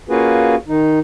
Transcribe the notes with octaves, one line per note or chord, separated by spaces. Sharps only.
A#3 C#4 F4 F#4 G#4 B4
D#3 D#4